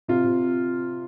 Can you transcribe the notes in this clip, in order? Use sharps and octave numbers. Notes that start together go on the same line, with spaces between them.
C3 F4
C3